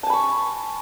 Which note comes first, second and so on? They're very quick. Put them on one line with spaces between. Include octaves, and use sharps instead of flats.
A5 G#5 B5 C#6